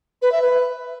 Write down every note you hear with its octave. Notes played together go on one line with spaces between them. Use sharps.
B4
E5
B4